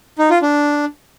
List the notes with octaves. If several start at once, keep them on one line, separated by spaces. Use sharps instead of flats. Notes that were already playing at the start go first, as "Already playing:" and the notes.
D#4
F4
D4